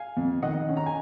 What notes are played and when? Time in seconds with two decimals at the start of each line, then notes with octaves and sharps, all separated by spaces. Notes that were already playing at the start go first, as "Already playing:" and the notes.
Already playing: F5 G#5
0.17 F2
0.42 D#3 D#5 F#5
0.69 C#4
0.77 A#5
0.86 G#5